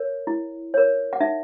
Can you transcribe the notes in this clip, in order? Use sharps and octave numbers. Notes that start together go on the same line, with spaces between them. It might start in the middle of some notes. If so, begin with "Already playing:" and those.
Already playing: A#4 C#5
E4
A#4 C#5
F#5
D#4 E5